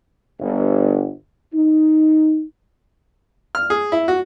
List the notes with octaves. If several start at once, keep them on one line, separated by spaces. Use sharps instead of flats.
G1
D#4
F6
G#4
E4
F#4